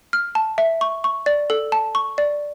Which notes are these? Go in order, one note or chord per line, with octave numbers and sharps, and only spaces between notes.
F6
A5
E5
C#6
C#6
D5
A4
A5
C#6
D5